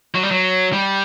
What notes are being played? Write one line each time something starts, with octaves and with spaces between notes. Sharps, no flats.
F#3
G3
F#3
G3